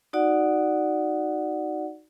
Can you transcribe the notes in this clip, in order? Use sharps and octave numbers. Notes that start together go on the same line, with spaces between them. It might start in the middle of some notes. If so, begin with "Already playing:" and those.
D#4 F#4 D5 F#5